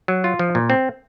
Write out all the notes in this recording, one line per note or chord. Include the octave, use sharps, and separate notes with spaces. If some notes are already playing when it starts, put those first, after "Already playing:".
F#3
F4
F3
A#2
C4